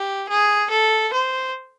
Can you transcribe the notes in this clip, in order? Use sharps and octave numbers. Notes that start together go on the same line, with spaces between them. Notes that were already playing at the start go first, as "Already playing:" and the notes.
Already playing: G4
G#4
A4
C5